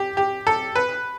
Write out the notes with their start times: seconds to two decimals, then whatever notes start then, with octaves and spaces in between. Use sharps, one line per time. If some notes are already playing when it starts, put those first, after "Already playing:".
Already playing: G4
0.17 G4
0.47 A4
0.76 B4